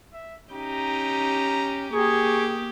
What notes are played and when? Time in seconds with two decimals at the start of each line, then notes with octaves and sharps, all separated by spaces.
0.13 E5
0.52 C#4 D#4 G4 A#5
1.93 A#3 G4 G#4 C#6